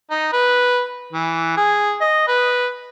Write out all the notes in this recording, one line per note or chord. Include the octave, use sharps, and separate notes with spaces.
D#4
B4
E3
G#4
D#5
B4